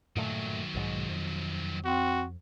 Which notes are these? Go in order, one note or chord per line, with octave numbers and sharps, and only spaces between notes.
G2 A#2 D#3 F#3 A3
B1 G#2 G#3
F2
C4 F#4